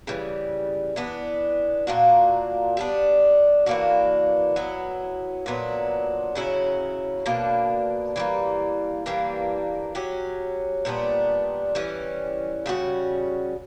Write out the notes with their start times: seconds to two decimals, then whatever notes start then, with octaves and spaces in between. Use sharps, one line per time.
0.07 C#3 E3 G3
0.96 E3 B3 D4
1.87 A#2 A#3 D4 F#4
2.77 G3 B3 D4
3.66 E3 A#3 D4 F#4
4.56 F#3 B3 E4
5.46 A#2 F#3 B3 D4
6.35 C#3 F#3 C#4 E4
7.26 B2 A#3 D4
8.16 E3 G3 A#3
9.06 E3 G3 A#3 D4
9.95 F#3 C#4 G4
10.85 A#2 G3 B3 D4
11.75 E3 G3 C#4
12.66 C#3 G3 C#4 F#4